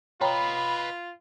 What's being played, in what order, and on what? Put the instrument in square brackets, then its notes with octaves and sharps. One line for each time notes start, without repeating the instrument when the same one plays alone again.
[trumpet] F4 [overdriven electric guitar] B4 D#5 [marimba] C#5 G5 A#5 [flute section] B5